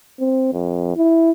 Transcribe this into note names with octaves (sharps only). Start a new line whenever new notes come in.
C4
F2
E4